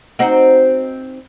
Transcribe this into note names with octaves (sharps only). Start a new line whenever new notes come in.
C4 D#4 F#4